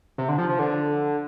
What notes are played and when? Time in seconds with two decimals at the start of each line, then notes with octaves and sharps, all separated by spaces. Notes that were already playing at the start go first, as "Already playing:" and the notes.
0.18 C3
0.28 D3
0.38 F3
0.49 F3
0.59 D3